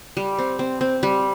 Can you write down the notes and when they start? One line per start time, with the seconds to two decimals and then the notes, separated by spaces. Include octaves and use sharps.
0.17 G3
0.38 C4
0.59 C4
0.81 C4
1.03 G3